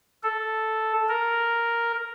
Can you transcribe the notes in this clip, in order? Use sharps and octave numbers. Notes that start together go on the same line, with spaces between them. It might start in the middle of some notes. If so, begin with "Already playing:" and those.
A4
A#4